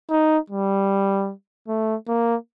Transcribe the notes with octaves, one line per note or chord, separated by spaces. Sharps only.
D#4
G3
A3
A#3